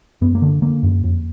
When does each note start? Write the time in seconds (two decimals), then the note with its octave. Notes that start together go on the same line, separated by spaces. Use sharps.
0.21 F#2 B3
0.35 A#3
0.42 D3
0.62 D3 A#3
0.83 F#2
1.04 F2